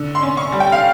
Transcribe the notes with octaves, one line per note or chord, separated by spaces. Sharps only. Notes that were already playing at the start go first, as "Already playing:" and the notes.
Already playing: D3
C6
C#4
C#6
G3
G5
F5